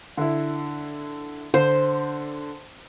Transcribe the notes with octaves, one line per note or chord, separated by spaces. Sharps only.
D3 E4
D3 C5